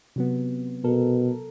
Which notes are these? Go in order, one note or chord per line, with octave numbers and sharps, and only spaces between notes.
C3 F#3 B3
B2 A4 A#4